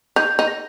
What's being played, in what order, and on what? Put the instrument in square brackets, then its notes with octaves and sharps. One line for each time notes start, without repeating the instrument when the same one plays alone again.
[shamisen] D#4 [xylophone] G6
[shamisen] D#4
[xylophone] A#6